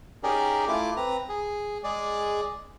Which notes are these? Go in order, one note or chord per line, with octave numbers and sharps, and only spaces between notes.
C#4 D#4 G4 G#4 A#4 D5
A3 E4 F4 D6
C4 B4 A#5
G#4
G#3 G#4 D5